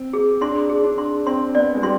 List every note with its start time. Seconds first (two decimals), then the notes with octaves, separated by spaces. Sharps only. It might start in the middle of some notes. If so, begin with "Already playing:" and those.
Already playing: C4
0.13 G#4
0.41 D4 C6
0.69 G#4
0.84 D4
0.98 C6
1.26 C4 C6
1.55 B3 D5
1.75 G#3
1.83 G3 C6